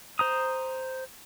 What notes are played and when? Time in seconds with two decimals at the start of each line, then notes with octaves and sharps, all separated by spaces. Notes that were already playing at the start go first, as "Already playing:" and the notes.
0.19 C5 A#5 D#6